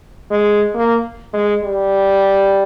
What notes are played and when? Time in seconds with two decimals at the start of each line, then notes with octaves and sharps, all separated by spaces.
0.31 G#3
0.75 A#3
1.33 G#3
1.64 G3